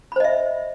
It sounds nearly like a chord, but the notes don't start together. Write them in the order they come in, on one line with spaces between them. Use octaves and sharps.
B5 C5 D#5 E5